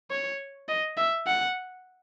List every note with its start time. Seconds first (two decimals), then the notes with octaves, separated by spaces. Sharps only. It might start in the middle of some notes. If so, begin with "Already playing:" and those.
0.10 C#5
0.68 D#5
0.97 E5
1.27 F#5